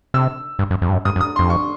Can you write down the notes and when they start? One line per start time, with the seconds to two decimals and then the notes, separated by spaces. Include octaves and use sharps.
0.14 C3 E6
0.59 G2
0.71 F#2
0.82 F2
0.89 G2
0.93 F#2
1.05 G2 D#6
1.16 F#2
1.21 D#6
1.36 F2 C6
1.50 C#6